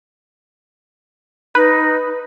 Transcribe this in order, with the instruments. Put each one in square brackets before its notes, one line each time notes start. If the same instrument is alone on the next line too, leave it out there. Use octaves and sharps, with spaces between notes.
[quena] D#4 [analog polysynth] B4